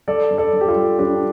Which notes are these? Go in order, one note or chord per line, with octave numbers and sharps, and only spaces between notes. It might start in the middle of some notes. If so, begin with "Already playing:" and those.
G3 A4 D5
G2
A4 D5
G2
G4
F4 A4
G3
G3 D4 G4